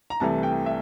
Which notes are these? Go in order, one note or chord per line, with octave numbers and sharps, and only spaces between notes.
A#5
C2 C3 E3 A3 A5
G5
E5